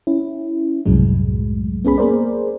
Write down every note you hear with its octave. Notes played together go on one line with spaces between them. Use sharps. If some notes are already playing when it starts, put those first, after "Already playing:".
C#4 E4
C2 F#2 A2 F#3 G#3
B3 C#4 G#4 B5
A#3 G#4 A#4 C5 D5